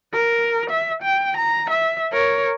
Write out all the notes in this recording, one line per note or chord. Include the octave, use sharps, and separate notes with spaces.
A#4
E5
G5
A#5
E5
A#4 C#5